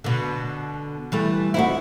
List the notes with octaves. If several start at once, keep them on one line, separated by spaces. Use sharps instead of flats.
B2 D3
E3 G3 A3
D2 C4 D#4 E4 F#4